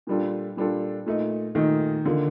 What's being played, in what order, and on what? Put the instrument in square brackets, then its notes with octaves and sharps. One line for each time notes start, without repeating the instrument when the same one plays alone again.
[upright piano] A#2 G3 D4 F4 A4
A#2 G3 D4 F4 A4
A#2 A3 D#4
[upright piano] A#2 A3 D#4 [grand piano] D#3
[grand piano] D3 [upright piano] D#3 A#3 F4